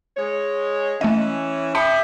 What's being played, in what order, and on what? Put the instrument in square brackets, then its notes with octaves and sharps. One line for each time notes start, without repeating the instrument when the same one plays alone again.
[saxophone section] G#3 C#5
[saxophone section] E3 C#4 [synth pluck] A3 D#5
[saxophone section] G4 D#5 E5 [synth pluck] A5 B5 C#7